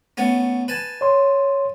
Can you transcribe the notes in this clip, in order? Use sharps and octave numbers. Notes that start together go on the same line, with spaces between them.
A3 B3 C#4
B4 G#5 A5
C#5 C6